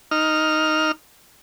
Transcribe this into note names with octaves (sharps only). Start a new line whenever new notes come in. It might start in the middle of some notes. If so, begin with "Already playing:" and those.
D#4 F6